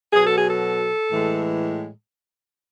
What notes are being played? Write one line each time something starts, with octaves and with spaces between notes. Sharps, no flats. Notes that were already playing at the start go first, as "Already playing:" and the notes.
B2 F#3 G#4
A4
G#4
A4
A2 E3 G#3